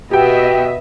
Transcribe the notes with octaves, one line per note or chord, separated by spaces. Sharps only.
B2 B3 F#4 G4 D#5 E5 G5